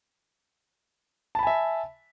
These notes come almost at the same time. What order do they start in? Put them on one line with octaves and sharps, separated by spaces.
A5 B5 G#5 E5